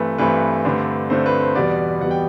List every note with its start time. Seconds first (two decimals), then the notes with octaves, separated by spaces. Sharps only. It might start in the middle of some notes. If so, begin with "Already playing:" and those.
Already playing: G2 E3 A3 C4 B4
0.18 G2 E3 A3 C4 B4
0.65 G2 D3 A3 C4
1.10 G2 D3 A3 C4 C5
1.26 B4
1.41 C5
1.55 E2 B2 G3 B3 D5
2.01 E2 B2 G3 B3 F#5
2.11 G5